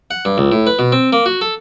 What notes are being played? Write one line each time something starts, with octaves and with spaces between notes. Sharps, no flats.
F#5
G2
C#2
A2
B4
B2
C4
A#3
F#4
A4